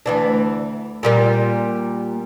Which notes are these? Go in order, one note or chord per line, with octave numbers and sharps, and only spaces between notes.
D2 E3 D4
A#2 G3 A#3